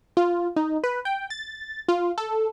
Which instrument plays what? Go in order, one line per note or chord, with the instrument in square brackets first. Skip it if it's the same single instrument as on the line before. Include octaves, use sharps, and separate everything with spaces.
[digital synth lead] F4
D#4
B4
G5
A6
F4
A4